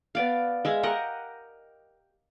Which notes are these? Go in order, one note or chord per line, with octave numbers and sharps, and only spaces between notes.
B3 D5 F5
G#3 E5 F5
G4 A#4 D#5 F#5